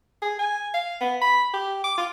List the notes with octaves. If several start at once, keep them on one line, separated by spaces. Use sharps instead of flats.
G#4
G#5
F5
B3
B5
G4
D6
F4